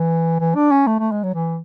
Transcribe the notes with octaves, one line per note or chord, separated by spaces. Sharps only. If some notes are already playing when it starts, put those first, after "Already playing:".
Already playing: E3
E3
D4
C#4
A3
A3
G#3
F#3
E3